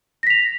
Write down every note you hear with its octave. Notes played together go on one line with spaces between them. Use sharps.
A#6 B6 F7